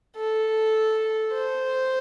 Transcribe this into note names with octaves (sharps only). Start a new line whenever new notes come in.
A4
C5